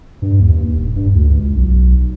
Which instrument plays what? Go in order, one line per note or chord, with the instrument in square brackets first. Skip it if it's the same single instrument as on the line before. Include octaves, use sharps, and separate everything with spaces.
[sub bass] G2
D#2
D#1
G2
D2
C#2
B1